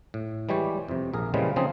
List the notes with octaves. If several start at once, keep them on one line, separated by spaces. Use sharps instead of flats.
A2
E3 G3 G#3 G4 C#5 D5
F2 C3
A#1 G#4 A#4
A#2 C#3 E3 F3 G3 G#3
C#3 F3 C4 D#4 G#4 A4